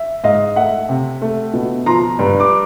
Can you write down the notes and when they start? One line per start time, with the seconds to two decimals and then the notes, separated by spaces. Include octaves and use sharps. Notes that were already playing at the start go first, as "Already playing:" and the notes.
Already playing: E5
0.24 G#2 D#5 F5
0.56 A3 E5 F#5
0.89 C3
1.22 A3
1.54 B2
1.86 F3 A#5 C6
2.19 G2
2.40 D6